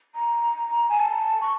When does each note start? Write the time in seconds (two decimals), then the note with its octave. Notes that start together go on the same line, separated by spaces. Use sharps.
0.15 A#5
0.89 G#5
1.00 A5
1.41 C#6